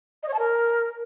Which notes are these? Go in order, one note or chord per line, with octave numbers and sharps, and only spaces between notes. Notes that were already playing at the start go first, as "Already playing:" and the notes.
D#5
C#5
A5
A#4